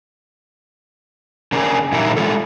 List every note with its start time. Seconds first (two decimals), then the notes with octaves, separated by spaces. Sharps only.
1.52 C#3 A#3 D4 G#4
1.92 A#2 E3 G3 A#3 D#4 E4
2.17 G#3 F4 A4